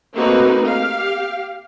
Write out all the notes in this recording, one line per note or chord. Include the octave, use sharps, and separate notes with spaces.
A3 A#3 C4 D#4 F#4 B4
G4 F5